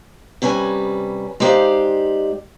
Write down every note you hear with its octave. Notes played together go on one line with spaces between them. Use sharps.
C3 G3 C#4 B4 G#5
G#3 D#4 G4 C5 D5 F5